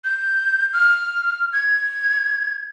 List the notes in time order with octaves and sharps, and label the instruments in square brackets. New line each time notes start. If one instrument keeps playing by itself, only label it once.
[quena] G6
F6
G#6